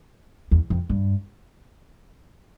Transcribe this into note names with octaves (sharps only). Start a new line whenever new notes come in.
E2
F2
G2